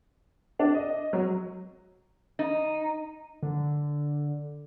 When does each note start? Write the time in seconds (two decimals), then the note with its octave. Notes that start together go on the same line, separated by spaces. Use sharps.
0.59 D4
0.74 D#5
1.13 F#3
2.39 D#4
3.42 D3